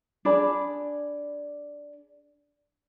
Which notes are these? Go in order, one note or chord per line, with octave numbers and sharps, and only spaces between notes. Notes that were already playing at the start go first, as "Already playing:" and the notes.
D4 G#4 D5 B5